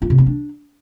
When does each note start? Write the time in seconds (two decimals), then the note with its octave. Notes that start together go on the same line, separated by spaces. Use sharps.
0.02 F4
0.10 C3
0.18 C4
0.26 D4